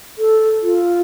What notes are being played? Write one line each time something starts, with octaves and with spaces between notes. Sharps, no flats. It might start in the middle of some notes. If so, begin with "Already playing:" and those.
A4
F4